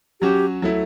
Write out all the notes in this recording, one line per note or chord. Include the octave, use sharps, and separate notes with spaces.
F#3 C#4 F#4 G4
F#3 A3 E4